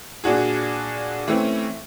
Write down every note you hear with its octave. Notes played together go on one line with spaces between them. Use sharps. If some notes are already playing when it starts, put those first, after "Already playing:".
A#2 D4 F#4 G#4
E3 A3 C4 C#4